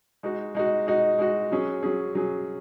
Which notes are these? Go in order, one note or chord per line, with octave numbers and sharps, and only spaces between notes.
G#3 D#4 F#4
G#3 D#4 F#4
G#3 D#4 F#4
G#3 D#4 F#4
F#3 C#4 G#4
F#3 C#4 G#4
F#3 C#4 G#4